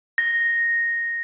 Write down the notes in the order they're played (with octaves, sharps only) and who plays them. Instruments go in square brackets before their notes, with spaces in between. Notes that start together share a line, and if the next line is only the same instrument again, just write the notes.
[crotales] A#6